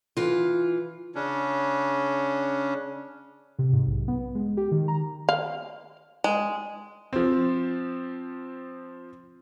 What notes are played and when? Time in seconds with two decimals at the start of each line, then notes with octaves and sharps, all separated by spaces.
0.17 E3 F4
1.15 C#3 C#4 D4
3.59 C3
3.73 G#2
3.87 B1
4.08 B3
4.35 G#3
4.57 G4
4.71 D#3
4.88 A#5
5.29 F5
6.24 G#3
7.13 F3 C4